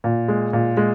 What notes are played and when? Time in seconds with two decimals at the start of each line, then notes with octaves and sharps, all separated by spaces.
0.04 A#2
0.28 G#3
0.53 A#2
0.77 G#3